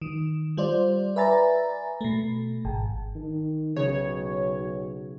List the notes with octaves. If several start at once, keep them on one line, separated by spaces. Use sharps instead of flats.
D#3
G3 F4 C5 D5
B4 D5 E5 G#5 A#5 A6
B2 A3
G#1
D#3
B1 C#3 C#5